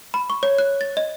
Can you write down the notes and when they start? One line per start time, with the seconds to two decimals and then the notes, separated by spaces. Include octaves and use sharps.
0.14 B5
0.30 C#6
0.43 C#5
0.58 F#6
0.81 A6
0.97 D#5